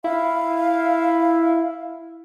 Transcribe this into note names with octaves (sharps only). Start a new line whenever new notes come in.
E4 F5